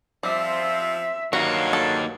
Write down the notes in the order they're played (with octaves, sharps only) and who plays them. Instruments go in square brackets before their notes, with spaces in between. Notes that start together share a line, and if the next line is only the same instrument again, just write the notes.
[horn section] F3 C4 [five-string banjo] G3 [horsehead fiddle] E5
[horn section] G2 F#3 [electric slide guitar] A#3 D#4 [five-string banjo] F#4 [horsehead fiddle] F5
[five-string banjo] A4